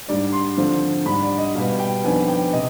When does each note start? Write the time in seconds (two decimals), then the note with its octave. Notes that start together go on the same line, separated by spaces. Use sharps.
0.08 G#2 G3 D4 D5
0.33 C6
0.57 D3 F3 C4
1.06 G#2 G3 D4 B5
1.23 D5
1.38 D#5
1.55 B2 G3 B3 F5
1.80 G5
2.04 F2 D#3 B3 D4 G#5
2.28 G5
2.53 C3 D#5